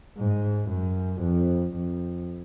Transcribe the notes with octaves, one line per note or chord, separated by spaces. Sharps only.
G#2
F#2
F2
F2